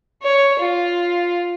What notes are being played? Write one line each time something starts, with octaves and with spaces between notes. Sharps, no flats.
C#5
F4